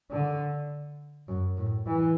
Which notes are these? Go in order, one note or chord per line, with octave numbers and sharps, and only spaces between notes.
D3
F#2
A2
E3